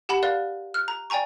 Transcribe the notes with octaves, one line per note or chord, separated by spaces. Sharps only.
G4 F#5 A5 B5 E7
A#4 D5 F5 F#6
F6 F#6
A#5
D5 G5 G#5 A#5 C#6